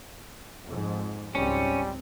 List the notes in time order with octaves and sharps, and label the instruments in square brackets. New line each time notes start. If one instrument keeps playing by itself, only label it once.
[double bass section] F2 G#2
[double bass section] C#2 G#2 C4 [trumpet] G3 [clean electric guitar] C#4